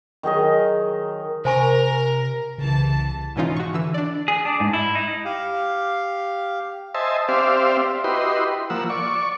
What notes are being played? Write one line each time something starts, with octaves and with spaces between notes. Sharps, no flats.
D#3 F#3 G#4 D#5
C3 A#4 C5 G#5 C#6
C2 C#3 E3 A5
G#2 B2 E3 C#4 D#4 F4
F#4 C#6
D3 E3 E6
D4 D5
G#4
D4
G#2
E4
D#4
G4 F5
C5 D#5 E5 G#5 A5
C4 G4 C5 D5 E5 F5
E4 F#4 G4 B4 D#5 C6
F3 A#3 F#5 E6
D5 C#6